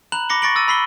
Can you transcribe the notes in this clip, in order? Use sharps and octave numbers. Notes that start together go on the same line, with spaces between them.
A#5 B5 F#6 E7 F#7
B5 D6 A#6 C#7 G7
C#6 A6 A#6 C#7 D7 F#7
D6 E6 A6 D#7
B5 E6 B6 C7 F#7 G7